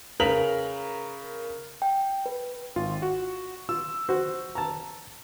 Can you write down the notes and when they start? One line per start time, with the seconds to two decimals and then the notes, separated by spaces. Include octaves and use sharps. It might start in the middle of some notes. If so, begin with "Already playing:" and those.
0.20 C#3 A#4 B4 B6 F7 F#7
1.82 G5
2.26 B4
2.76 G#1 F4
3.02 F#4
3.69 F4 E6
4.09 F#4 C5
4.55 A5 A#5